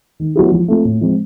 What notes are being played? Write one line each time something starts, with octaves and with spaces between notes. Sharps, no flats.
D#3
F#3 B3 E4 G4
F3
A3 C4 F4
A2
F3 G#3 C4